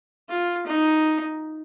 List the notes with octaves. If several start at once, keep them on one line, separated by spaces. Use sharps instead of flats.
F4
D#4